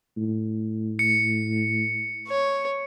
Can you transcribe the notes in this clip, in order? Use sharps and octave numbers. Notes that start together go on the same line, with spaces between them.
A2
C#7
C#5